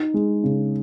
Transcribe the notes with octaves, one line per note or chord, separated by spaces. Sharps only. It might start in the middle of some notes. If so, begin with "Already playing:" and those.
Already playing: D#4
G#3
C#3